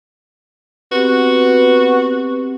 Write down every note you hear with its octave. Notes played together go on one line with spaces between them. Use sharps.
B3 C4 F#4 G4